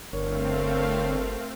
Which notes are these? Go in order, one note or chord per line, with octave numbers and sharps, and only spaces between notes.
G1 D3 A3 C4 A#4 C#5 F5